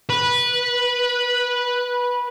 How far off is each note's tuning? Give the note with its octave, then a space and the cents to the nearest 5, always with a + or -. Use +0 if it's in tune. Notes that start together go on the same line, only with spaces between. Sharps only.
B4 -15